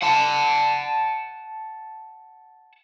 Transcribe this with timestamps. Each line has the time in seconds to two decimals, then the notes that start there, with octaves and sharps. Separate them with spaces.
0.03 F#5 A5